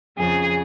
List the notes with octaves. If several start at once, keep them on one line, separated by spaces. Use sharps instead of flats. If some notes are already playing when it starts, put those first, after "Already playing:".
F2 C#3 G#4